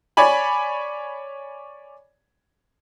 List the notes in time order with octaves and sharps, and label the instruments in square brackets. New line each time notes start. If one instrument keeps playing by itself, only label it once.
[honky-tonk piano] C#5 D5 G#5 B5